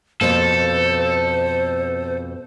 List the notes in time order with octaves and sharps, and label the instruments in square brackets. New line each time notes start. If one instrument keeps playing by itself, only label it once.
[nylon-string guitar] F2 B2 A#3 [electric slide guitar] A4 [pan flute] C5